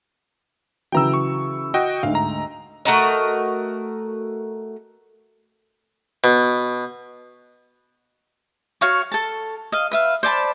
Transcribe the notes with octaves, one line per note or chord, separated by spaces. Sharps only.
C#3 E3 F#3 G5 A#5 E6
C#6
F#4 D#5 G5
D2 G#2 F5
A#5
A3 F#4 A#4 D#5
B2
F#4 C#5 F5 C#6
A4 A5
D#5 F5
B4 E5 F5
C5 D5 A5 B5